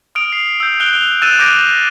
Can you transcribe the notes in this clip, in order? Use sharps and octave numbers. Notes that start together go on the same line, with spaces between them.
D#6 F6 D7 F7
C7
E6 G6
E6 F#6 D7 F7 G7
E6 F#6 A6 D#7 E7
D6 F6 G6 A#6 D7 E7